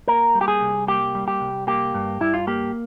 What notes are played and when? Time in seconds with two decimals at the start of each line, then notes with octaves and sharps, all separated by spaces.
0.08 A#3 A#4
0.35 G3
0.41 G4
0.48 G#4
0.61 C2
0.87 A#3 G4
1.15 G3
1.28 G4
1.41 C2
1.67 A#3 G4
1.94 G2
2.21 G2 E4
2.34 F4
2.47 A#3 G4